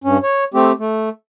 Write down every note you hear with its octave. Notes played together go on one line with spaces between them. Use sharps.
G2 C#4
C#5
A3 C4 G4
A3